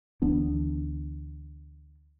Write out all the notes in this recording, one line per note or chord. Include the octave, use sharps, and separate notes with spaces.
D2 E3 B3 D4